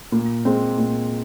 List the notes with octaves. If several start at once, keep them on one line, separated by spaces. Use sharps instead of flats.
A#2
G#3 C4
A#2